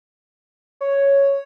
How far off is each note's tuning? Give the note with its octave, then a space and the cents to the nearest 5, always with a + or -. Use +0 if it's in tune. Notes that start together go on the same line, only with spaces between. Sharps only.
C#5 +0